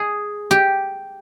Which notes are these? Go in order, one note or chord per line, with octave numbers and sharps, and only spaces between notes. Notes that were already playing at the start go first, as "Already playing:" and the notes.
Already playing: G#4
G4